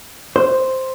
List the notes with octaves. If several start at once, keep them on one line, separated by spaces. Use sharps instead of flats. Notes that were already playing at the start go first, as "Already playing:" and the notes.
C5